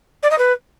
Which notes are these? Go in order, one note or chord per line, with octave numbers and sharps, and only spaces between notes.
D5
D#5
B4